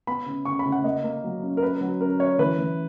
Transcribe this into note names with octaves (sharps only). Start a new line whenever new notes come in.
B3 B5
C#3
C#3 C#6
B5
C#3
F#5
A#3 D#5
A#3
F#3
C#4
A#4
C#4 B4
F#3
C#4 A#4
C#4 C#5
E3 B4
E3